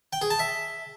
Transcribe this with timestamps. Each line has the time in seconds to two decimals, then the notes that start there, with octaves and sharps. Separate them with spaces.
0.13 G5
0.22 G#4
0.30 A5
0.39 E5